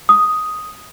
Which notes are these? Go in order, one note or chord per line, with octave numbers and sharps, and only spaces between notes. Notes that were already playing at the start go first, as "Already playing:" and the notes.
D#6